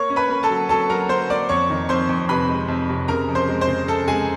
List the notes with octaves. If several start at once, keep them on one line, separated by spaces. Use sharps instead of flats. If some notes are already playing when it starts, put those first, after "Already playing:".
Already playing: A#3 C#5 C#6
C#4
B4 B5
A#3
A4 A5
F#3
F#3 A4 A5
F#3 A#4 A#5
A#3 C5 C6
A#3 D5 D6
F2 C#5 C#6
D#3
F2 C5 C6
F2
C3 B4 B5
G#3
F2
C3
C#3 A#4 A#5
F2
C5 C6
G#3
C5 C6
C#3
C#3 A4 A5
G#3 G#4 G#5